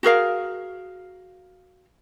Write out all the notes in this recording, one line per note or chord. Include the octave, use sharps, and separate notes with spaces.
F#4 G#4 A#4 F5